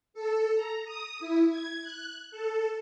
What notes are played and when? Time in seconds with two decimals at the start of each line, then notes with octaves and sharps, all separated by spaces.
0.14 A4
0.55 A#5
0.85 D#6
1.20 E4
1.49 G#6
1.83 F#6
2.31 A4